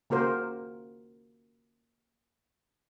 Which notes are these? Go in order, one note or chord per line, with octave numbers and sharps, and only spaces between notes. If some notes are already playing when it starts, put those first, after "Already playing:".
C#3 A#3 F#4 A#4 C5